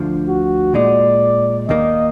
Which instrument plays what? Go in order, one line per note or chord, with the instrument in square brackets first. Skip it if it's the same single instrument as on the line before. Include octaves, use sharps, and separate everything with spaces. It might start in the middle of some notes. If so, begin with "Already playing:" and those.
Already playing: [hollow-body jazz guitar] D2 D3 F3
[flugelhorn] F#4
[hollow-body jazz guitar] A#2 G#3 D#4 [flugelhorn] D5
[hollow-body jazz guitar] D#2 D#3 A#3 [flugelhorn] D#5